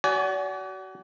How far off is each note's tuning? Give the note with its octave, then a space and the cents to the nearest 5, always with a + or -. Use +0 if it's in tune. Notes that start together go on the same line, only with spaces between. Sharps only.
F#4 +30 D5 -40 G#5 +5